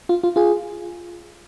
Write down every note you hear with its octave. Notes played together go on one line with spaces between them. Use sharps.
F4
F4
F4 G#4